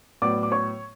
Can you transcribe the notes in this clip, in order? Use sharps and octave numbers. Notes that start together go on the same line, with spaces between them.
A2 F#3 B3 D5 D6
D6
C#5 C#6